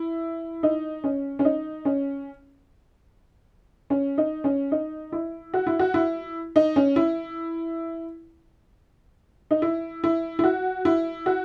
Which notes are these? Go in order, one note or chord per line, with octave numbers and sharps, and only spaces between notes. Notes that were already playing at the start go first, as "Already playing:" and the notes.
Already playing: E4
D#4
C#4
C#4
D#4
C#4
C#4
D#4
C#4
D#4
E4
F#4
E4
F#4
E4
D#4
C#4
E4
D#4
E4
E4
E4
F#4
E4
F#4